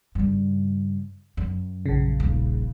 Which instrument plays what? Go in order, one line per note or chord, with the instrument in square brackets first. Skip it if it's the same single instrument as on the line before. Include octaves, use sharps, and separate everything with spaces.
[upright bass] G2 C#3
F#2
[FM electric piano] A#1 C#3
[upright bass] D#1